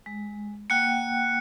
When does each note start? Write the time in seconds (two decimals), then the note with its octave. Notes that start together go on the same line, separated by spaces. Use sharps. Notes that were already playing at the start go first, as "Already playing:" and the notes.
0.06 G#3
0.70 A#3 F#5 G5 F#6 C#7